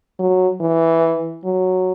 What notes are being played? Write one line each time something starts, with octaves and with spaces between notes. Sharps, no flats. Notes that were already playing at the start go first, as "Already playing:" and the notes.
F#3
E3
F#3